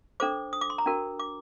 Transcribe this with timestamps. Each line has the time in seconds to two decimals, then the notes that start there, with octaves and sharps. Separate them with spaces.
0.20 D4 A4 C5 D6
0.53 D#6
0.61 D6
0.70 C6
0.78 A#5
0.86 D4 F#4 A#4
1.19 D6